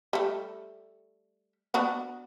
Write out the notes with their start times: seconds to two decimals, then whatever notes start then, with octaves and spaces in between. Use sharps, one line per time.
0.13 G3 A3
1.74 B3 D4 F#4